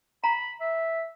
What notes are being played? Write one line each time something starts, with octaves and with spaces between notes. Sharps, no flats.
A#5 B5
E5